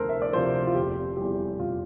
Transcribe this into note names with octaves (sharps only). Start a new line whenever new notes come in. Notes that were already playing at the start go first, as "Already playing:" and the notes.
Already playing: D2 C3 F3 A4 A#4 C5
E5
D5
C3 F3 C5
F4
F1 G4
E2 E3 G3 G4
F1 F4